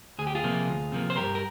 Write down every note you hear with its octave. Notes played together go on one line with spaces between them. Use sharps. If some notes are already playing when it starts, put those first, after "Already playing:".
D2 G#4
G4
F4 G#4
C3 F3 A#3
D2
C3 F3 A#3
C5
G2 G4 A#4
A#4